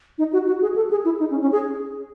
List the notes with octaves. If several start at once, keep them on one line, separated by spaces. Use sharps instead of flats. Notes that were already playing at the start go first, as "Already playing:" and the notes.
D#4
F#4
F#4
G#4
A4
G#4
E4
D#4
C#4
C#4
G#4